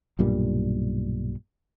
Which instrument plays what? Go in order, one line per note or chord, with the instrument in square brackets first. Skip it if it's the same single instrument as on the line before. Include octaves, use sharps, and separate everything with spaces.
[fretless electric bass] B1 G2 A#2 G3